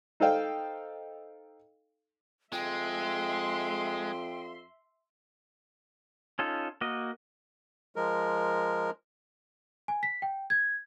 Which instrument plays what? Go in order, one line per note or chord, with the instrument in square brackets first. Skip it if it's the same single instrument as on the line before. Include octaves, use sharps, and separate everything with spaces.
[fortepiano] D#4 A4 C5 D#5 F5 G5
[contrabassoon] F2 [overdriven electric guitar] G#3 [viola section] E5 C6 [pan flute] G5
[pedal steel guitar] C#4 D#4 F4 A4
A#3 F#4 D#5
[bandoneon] F3 G#3 A#4
[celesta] G#5
B6
G5
G#6